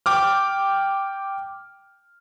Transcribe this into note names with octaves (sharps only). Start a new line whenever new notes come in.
G5 D6 F6